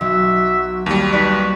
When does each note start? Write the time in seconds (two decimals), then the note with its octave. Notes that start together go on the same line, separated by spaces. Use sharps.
0.01 B1 F#4 E5
0.86 D#2 G3
1.11 D#4 B4 D5 C#6 B6